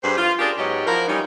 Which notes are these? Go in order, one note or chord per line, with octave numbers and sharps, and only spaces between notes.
G2 G#4 A4 B4 C5
F4
C#4 D4 G4 G#4 A#4
G#2 F#3 B3 G4 C#5 D#5
F3 E4 F#4 A#4
E3 G3 C#4 D#4